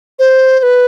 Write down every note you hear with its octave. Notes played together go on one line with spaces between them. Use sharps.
C5
C5
B4